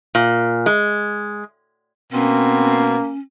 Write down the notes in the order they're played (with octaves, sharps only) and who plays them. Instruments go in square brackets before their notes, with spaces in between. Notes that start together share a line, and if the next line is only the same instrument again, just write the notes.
[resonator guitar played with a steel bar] A#2
G#3
[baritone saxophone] B2 [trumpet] A#3 [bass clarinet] C4 [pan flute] C#4